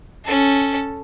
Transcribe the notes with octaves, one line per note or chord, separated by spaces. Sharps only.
C#4 A4